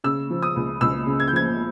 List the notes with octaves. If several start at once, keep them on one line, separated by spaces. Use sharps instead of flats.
C#3 E6
F3
D#6
C#2
C#2 E6
C#3
G#6
G6
F3 G#6